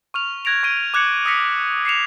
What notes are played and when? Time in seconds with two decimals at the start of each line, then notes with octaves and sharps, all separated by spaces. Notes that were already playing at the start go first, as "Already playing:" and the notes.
0.14 C#6 F6 F7
0.45 F#6 G#6 A#6 D7 F7
0.63 C#6 A#6 D7 D#7 G7
0.94 D6 F#6 G#6 C#7 F#7
1.26 D#6 E6 A#6 B6 C#7 D7
1.85 C7 C#7 E7 F7